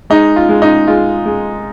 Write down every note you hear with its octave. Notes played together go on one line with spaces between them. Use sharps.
G#3 D#4
F4
G#3
D#4
G#3 F4
G#3